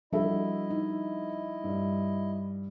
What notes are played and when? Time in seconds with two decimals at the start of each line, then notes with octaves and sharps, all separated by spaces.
0.13 F3 G3 D4 E4 F#4 A4 D#5 E5
0.70 D#4
1.64 G2